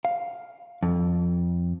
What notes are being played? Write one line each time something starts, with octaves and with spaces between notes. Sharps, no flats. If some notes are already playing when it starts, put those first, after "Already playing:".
F5
F2